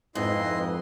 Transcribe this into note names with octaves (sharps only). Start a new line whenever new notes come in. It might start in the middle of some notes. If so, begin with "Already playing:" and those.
F2 G#2 E4 B4 D#5 C6